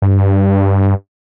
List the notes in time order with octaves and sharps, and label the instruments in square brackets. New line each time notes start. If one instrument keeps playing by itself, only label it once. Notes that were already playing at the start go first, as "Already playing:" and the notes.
[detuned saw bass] G2